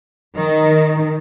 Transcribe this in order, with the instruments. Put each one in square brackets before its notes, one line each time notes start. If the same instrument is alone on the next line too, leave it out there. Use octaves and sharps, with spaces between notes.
[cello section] D#3